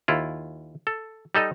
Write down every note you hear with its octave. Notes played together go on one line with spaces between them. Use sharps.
D#2 E4 F4
A4
G3 D#4 A4 D#5